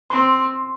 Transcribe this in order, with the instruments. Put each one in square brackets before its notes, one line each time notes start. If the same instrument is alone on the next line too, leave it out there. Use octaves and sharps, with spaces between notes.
[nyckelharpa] C4 [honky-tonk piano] C6